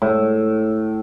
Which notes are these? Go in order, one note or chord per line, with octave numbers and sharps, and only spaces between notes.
A2